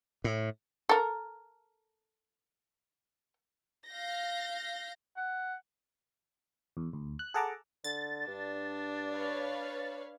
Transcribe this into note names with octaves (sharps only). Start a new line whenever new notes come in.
A2
A4 A#4
F5 G6 A#6
F#5
E2
D2
F#6
G#4 A4 F#5 A5 A#5 D6
D3 A6
G2 D4
B4 C#5 F5